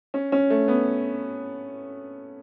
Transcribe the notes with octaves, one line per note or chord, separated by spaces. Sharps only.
C#4
C#4
A3
B3